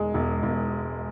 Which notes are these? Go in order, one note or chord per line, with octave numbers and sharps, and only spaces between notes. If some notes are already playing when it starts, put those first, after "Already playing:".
Already playing: E1 G#3
E1
E1